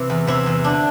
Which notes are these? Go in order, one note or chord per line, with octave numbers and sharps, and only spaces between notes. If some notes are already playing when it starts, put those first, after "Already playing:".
Already playing: C3 E3 E4
E2
C3 E4
E2
D3 D4